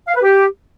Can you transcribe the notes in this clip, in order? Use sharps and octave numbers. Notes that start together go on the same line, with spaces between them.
F5
B4
G4